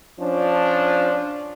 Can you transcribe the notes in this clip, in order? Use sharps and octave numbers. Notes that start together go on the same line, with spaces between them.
F3 C#4 D4